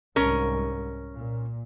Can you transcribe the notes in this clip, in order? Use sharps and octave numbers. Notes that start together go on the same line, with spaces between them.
C2 G#2 C#4 A#4
A#2